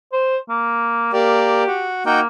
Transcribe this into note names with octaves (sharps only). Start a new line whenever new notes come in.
C5
A#3
A#3 G4 A#4 D5
F#4
A#3 D#4 F#4 G5